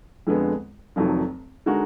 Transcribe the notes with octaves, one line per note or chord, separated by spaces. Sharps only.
F2 D3 G#3 B3
F1 F2 D#3 F#3
D3 G#3 D#4 F#4 A#4